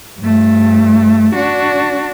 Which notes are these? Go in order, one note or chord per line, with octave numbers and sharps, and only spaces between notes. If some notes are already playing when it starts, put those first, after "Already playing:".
G2 A3
D4 F#4